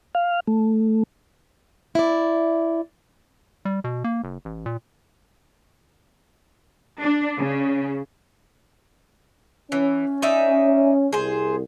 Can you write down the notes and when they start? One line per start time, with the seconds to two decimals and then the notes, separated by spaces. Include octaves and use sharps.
0.15 F5
0.47 A3
1.95 E4 D5
3.65 G3
3.84 B2
4.04 A#3
4.24 F#1
4.45 A1
4.66 A#2
7.00 D4
7.37 C#3
9.72 E3 C#4
10.22 D#4 D5 E5
11.13 C2 G#4 C5